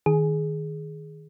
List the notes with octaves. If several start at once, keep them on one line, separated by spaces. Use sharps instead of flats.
D#3 G#4